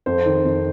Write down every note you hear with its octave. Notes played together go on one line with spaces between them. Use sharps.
F2 C5
D#3
F2